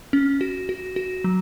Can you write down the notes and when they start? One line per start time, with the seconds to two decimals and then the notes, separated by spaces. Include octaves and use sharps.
0.13 C#4
0.41 F#4
0.69 F#4
0.96 F#4
1.24 F#3